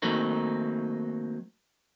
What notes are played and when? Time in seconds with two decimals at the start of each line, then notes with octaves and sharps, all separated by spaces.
0.02 D#3 F#3 A3 A#3 C4 D#4